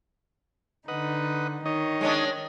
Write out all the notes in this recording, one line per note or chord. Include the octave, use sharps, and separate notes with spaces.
D3 D#4 B4 D#5 F#5
D#3 D#4 C#5 D#5
G#3 C#4 D4